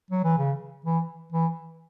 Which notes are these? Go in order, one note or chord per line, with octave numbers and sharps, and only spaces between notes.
F#3
E3
C#3
E3
E3